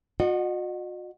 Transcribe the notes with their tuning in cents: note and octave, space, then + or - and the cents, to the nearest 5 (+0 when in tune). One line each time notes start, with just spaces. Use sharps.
F#4 -40 D#5 -35 F#5 +0